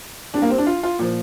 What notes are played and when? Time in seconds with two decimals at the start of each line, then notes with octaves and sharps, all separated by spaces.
0.34 C3 G3 D4
0.42 A#3
0.50 C4
0.58 D4
0.67 F4
0.83 F4
0.99 A#2 F3